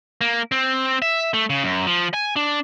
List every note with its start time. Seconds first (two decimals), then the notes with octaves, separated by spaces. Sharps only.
0.21 A#3
0.52 C4
1.02 E5
1.34 A3
1.50 C#3
1.64 F#2
1.87 F3
2.14 G#5
2.36 D4